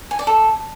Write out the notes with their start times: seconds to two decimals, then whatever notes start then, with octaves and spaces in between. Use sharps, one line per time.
0.11 G#5
0.19 D5
0.27 A4